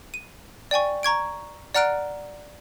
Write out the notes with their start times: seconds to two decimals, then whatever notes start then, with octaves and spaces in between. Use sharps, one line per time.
0.14 D#7
0.71 D5 G5 G#5 C#6
1.03 A#5 C#6 G#6 D7
1.75 D5 F#5 A#5 F6 F#6 D7